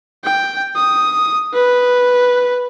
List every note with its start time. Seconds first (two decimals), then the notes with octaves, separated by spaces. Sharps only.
0.24 G5
0.76 D#6
1.54 B4